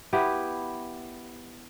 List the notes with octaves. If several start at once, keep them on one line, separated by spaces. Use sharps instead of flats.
B3 E4 G4